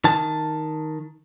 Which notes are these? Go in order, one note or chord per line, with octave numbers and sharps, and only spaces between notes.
D#3 A5